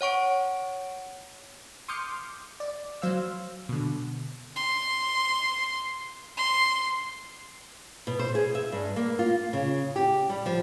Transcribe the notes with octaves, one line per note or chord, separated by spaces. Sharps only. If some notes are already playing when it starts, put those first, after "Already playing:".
C#5 F#5 C#6 D7
C6 D6 D#6 F6 G6 C#7
D5
F#3 C5 F5 E6
B2 D3
C6
C6
B2
C5
G#4
E5
G2
A#3
F4
C#3
G4
G3
F3